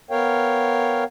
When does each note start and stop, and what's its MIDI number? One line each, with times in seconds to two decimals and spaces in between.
0.11 1.04 59
0.11 1.04 70
0.11 1.04 73
0.11 1.04 77
0.11 1.04 79